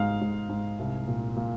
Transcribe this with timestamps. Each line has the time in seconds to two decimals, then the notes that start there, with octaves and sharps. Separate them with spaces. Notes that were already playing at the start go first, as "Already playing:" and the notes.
Already playing: G#2 G#3 F5
0.21 G#2
0.49 G#2
0.79 C2
1.08 A#2
1.36 A#2